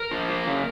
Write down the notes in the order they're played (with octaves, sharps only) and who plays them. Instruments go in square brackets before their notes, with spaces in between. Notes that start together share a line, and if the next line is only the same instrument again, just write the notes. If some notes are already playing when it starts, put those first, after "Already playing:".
Already playing: [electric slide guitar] A#4
F3
A#3
C#3